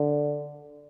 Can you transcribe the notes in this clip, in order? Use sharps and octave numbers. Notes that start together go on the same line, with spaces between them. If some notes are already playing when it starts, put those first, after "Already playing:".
Already playing: D3